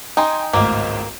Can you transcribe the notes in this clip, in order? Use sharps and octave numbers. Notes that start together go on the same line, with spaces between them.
D#4 G5 G#5 C6
G#1 C#2 A2 A#3